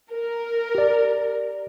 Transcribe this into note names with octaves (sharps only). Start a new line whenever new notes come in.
A#4
G4 D5